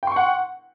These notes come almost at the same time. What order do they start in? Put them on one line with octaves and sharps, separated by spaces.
G5 C6 C#6 F#5